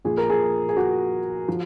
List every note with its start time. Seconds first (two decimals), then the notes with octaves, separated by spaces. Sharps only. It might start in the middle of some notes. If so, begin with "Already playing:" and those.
0.05 A#2 F3 G#4
0.17 A#4
0.30 G#4
0.69 G#4
0.77 F#4
1.48 F3